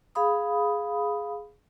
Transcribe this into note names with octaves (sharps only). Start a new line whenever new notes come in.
G#4 F5 B5 D#6